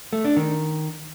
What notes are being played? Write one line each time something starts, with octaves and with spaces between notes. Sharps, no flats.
A3
D4
D#3